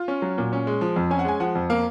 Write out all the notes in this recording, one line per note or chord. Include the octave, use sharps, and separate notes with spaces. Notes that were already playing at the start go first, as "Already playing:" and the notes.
Already playing: F4
C#4
F#3
A#2
C#4
G#3
F3
F2
C#4 G#5
F#5
G#3 G#5
F3 F#5
F2
A#3 F5